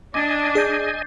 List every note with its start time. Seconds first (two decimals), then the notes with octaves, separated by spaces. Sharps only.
0.14 D4 D#5 G#5 D6 A6
0.55 G#4 D5 G6 C7